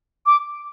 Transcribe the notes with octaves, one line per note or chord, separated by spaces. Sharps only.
D6